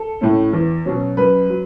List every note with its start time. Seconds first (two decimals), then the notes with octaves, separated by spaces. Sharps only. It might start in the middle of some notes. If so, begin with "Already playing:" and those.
Already playing: A4
0.21 A2 A3 C#4
0.53 E2
0.86 B2 F#3 C#4
1.17 F#2 B4
1.50 F#3